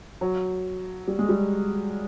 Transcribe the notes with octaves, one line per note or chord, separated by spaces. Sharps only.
F#3
G3
G#3
G3